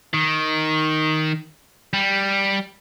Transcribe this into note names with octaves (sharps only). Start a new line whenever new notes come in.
D#3
G3